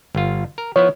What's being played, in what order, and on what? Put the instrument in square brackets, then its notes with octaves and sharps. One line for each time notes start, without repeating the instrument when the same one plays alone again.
[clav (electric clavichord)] G1 F4
A#4
[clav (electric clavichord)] F3 B3 E4 [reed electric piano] C#5